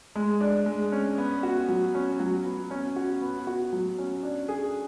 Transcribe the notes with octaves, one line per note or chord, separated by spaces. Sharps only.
G#3
D4
G#3
C#4
B3
F#4
F#3
C#4
F#3
B3
C#4
F#4
B3
F#4
F#3
C#4
D4
G#4